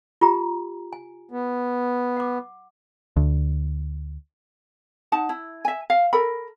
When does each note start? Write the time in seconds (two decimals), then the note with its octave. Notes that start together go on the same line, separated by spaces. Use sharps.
0.21 F4 G4 A#5
0.93 G#5
1.31 B3
2.17 F#5 D6
3.16 D2
5.12 D#4 F#5 A5
5.29 E4
5.65 E5 G#5
5.90 F5
6.13 A4 A#4 B5